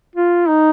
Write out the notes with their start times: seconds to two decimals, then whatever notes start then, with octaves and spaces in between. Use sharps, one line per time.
0.16 F4
0.48 D#4